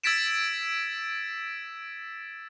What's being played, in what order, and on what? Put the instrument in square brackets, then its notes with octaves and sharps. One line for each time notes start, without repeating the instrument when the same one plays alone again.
[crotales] E6 G#6 A6 B6 D7 E7